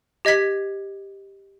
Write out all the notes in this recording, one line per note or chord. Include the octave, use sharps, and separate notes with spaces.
G4 D#5 G#6 B6